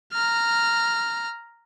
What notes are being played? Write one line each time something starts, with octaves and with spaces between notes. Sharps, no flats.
A#5 F6